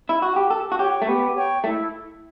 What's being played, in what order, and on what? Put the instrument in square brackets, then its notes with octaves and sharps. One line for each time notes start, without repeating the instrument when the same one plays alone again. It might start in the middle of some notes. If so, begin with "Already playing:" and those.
[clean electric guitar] E4
F#4
G4
[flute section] G4 [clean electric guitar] A4
[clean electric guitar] F#4
[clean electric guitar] G4 [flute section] C#5 G5 C#6
[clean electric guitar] A3
[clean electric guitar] B3 [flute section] G4
[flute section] C#5 G5 C#6
[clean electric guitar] A3 [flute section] E4